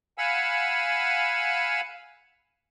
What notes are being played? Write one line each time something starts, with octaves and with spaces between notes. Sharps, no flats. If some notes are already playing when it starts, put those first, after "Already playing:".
F5 F#5 G#5 B5 E6